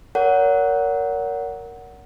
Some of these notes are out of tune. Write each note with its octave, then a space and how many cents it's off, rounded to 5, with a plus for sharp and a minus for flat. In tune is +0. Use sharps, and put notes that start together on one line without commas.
A#4 +0 C#5 +35 F#5 +0